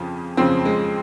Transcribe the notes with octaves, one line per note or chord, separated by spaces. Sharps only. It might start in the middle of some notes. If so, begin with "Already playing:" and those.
Already playing: F2 C#3 F3
F2 C#3 F3 C4
G#3